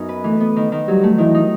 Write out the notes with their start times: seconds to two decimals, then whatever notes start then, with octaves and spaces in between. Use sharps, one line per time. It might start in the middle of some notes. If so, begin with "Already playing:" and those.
Already playing: F#2 B3 D#4
0.09 B4
0.24 E3 A3
0.40 B3
0.56 D#3
0.72 D#3
0.88 F#3 G3
1.03 A3
1.18 D#3 E3
1.34 D#4